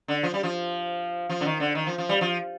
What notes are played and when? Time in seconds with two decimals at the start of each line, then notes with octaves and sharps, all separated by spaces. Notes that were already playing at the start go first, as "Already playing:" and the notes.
0.08 D3
0.23 F3
0.34 G3
0.43 F3
1.29 F3
1.41 D3
1.45 D#3
1.60 D3
1.75 D#3
1.87 F3
1.98 F3
2.09 G3
2.21 F3